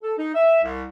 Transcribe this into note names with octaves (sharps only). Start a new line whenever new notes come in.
A4
D#4
E5
C2